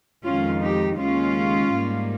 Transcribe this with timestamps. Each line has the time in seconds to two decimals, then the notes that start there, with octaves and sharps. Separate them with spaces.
0.24 F2 D#3 G#3 C#4 F4
0.61 D#4 G4
0.98 D#2 C#3 G#3 C#4 F4
1.72 G#2 G3 A#3